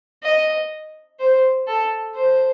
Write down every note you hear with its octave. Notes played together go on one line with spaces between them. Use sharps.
D#5
C5
A4
C5